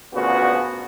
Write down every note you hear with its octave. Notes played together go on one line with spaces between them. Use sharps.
D2 A#2 C#3 B3 F#4